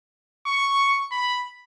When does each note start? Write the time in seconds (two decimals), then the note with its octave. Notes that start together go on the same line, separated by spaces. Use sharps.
0.47 C#6
1.11 B5